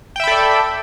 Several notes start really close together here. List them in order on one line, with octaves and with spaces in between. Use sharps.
G5 E5 B5 A4 D5